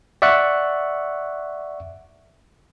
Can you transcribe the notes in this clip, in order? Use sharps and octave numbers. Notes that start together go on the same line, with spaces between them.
D5 E5 F#5 C#6 F#6